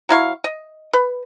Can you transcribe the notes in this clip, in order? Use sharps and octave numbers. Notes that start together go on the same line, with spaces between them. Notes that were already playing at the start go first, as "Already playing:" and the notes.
F#3 E4 F5 C#6
D#5
B4